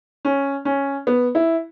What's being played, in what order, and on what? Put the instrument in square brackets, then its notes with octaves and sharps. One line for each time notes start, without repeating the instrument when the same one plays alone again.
[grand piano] C#4
C#4
B3
E4